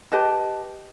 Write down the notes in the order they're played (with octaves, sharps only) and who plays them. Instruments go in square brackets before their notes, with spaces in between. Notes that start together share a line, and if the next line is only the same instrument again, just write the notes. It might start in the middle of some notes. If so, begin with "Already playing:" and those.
[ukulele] G4 B4 D#5 A5